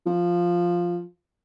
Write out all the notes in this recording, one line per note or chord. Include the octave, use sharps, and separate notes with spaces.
F3